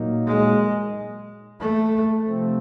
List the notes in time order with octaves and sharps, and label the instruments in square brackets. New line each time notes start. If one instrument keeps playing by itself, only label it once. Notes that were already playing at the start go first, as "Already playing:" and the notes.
Already playing: [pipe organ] A#2 F#3 A#3 D#4
[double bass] G#3
A3
[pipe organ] C3 F3 A3 C4